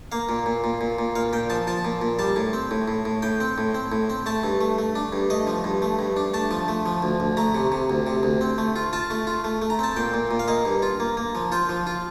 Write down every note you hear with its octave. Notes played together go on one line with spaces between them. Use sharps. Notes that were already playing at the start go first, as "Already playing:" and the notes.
A#3 F5
A#2
A#2
A#2
A#2
A#2
A#2 F5
A#2 G5
F3 A5
F3 A5
A#2
A#2
G3 A5
A2
C4
A2
A2
A2
A2 G5
C4
A2
C4
A2
C4
A3 A5
G2
A3
A3
D4
G2
A3 D#5
F3
G2
A3
G2
D4
A3 A5
F3
A3
F3
D2
D2
A3 A#5
C3
C3
D2
C3
D2
C4
A3
F4
F4 A5
A3
F4
A3
A3
A#5
C4 A5
A#2 G5
A#2
A#2
F5
A#3 D#5
G2
F4
A#3
A#3
F3
F4 C5
F3
F4